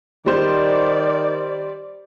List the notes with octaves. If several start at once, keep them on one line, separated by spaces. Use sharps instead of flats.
D#3 G3 C5 D5